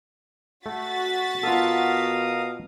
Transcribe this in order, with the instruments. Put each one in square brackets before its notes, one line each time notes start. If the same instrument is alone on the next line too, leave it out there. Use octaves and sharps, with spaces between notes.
[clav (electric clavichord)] A3 [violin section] F#4 A6 B6
[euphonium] B2 [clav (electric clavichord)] F4 A4 [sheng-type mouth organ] A#4 F5 D#6